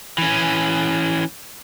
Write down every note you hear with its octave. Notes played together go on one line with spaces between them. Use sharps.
E3 C#4